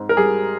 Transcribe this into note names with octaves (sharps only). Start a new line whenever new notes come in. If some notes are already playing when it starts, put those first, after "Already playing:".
Already playing: G#2 C4
A#4
G3 G#4